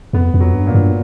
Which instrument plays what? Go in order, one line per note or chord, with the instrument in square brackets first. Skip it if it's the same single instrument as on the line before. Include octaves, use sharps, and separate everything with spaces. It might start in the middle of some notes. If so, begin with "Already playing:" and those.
[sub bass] F2 [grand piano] B3
[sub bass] F2
[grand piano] F#3
[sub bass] G2
[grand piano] A#2
[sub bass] G2